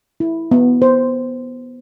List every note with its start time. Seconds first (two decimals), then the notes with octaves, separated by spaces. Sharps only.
0.20 E4
0.51 B3
0.82 C5